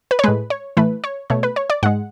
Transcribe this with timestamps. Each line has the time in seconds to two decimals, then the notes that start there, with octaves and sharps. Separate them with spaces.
0.11 B4
0.19 C#5
0.24 A2 G#3 B4
0.50 C#5
0.77 A2 E3 A3 B4
1.04 C#5
1.30 B2 A3 C#5
1.43 B4
1.56 C#5
1.70 D5
1.83 G#2 G#3 F#5